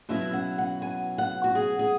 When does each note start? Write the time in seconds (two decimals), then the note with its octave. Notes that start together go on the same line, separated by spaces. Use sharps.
0.09 B2 F#3 C#4 E4 E5
0.33 F#5
0.58 F#5
0.82 G#5
1.18 F#5
1.44 F#4
1.55 G#4
1.79 G#4